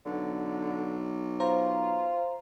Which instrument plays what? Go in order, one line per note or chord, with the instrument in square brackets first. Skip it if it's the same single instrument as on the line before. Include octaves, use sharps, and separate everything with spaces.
[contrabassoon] B1 [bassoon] D3
[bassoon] F4 [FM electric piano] C5 A#5